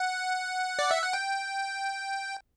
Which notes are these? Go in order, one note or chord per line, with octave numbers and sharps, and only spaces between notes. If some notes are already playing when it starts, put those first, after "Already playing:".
Already playing: F#5
D5
E5
F#5
G5